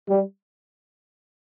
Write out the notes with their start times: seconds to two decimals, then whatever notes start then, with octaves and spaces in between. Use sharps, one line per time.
0.08 G3